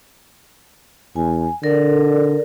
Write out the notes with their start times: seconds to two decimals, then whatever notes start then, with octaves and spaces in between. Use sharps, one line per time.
1.16 E2 G#5
1.63 D3 A4 A#4 D5